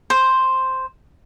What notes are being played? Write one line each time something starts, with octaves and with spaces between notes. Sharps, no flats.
C5